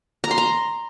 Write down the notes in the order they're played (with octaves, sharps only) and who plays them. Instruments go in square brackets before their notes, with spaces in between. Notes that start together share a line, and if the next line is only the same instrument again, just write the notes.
[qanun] A#5
C6
A#5